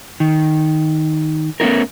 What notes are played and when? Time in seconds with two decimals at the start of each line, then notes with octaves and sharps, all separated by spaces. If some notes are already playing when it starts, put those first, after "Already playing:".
0.20 D#3
1.60 A3 B3 C#4 E4 A#4